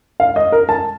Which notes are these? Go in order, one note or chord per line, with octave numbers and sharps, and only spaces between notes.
F5
D#5
A#4
A5